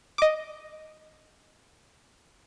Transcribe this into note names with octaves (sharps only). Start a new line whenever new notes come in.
D#5 D6